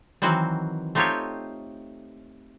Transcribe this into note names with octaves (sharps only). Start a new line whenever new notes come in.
D#3 E3 F#3 C4 F#4
A3 C4 D#4 F4 G4 C#5